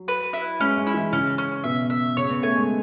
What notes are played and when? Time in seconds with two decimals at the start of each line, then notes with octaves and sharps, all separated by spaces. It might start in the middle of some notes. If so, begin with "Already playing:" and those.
Already playing: F#3
0.08 B4
0.33 E4
0.60 G#3 C#4
0.77 G#3
0.87 E4
0.94 E3
1.12 C#3 C#4
1.38 C#4
1.64 B2 E5
1.90 E5
2.17 C#3 C#5
2.29 B3
2.43 A3 G#5
2.56 G#3